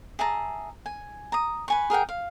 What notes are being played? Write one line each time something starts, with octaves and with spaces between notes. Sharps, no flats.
G#4 E5 A5 A#5
G#5
A#5 D#6
B4 G#5 C#6
G#4 A#4 F#5 G5
F5